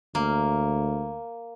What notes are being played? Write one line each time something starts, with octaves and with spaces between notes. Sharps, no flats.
D2 A#3